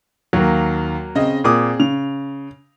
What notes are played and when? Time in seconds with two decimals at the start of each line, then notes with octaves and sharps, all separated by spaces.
0.33 D#2 F#3 A#3
1.15 C#3 C4 D#5
1.44 A#2 C4 G#4 D6 D#6
1.80 C#3 F7